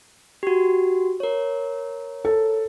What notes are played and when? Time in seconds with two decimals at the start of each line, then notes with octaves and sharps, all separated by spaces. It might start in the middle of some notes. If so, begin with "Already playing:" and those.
0.43 F#4 G4
1.20 A#4 C#5
2.25 A4